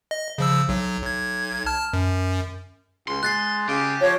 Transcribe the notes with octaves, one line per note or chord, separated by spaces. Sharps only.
D#5
C#3 F3 E6
B1 F#3
B1 G#6
A5 F6
F#2
C#2 C6
G#3 F#6 A6 C7
C#3 G4
F3 C#5